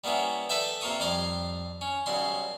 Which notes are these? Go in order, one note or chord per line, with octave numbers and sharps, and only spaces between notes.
G3 A#3 B3 C#4 E4
A4 B4 D5 E5 G5
C3 A#3 F4 C#6 D#6
F2 G3 A#5 C6 D6
C#4
B1 C#3 G3 C6